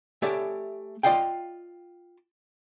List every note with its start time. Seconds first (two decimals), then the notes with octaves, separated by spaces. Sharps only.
0.22 A3 G4 C#5 D5 E5
1.03 F4 D5 D#5 F5 G5